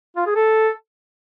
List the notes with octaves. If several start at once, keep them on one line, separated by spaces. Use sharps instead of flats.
F4
G#4
A4